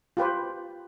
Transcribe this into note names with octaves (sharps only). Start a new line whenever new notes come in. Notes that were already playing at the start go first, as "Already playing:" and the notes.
F4 G4 B4 C5